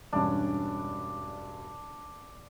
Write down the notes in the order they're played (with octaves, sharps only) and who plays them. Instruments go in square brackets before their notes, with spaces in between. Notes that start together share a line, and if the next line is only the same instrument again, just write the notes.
[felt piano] E1 G2 C#4 [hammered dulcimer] D4